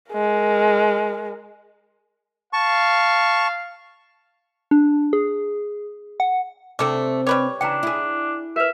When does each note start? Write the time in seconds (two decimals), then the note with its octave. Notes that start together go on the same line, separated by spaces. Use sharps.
0.12 G#3 A#4
2.53 F5 A5 C#6
4.71 D4
5.13 G#4
6.20 F#5
6.79 C3 A3 C4 D4 A4 D6
7.27 G3 B4 C#5 D6
7.61 C#3 E3 D4 G5 A#5
7.83 E4 G#4
8.56 A#4 B4 E5